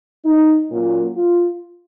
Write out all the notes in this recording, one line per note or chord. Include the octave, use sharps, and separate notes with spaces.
D#4
A#2 F#3 A#3 C#4 F4
F4